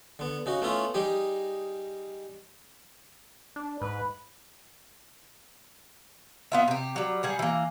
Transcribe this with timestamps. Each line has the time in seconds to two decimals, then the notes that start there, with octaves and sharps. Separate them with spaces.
0.19 D3 B3
0.46 C#3 D#4 F#4
0.62 A3 B3 C#4 E4 F4
0.94 G3 D#4 G4 G#4
3.56 D4
3.82 G#2 B4
6.52 B3 F4 E5
6.68 C3 G4
6.96 F#3 G3
7.23 G3 G#4 F#5
7.39 E3 A#3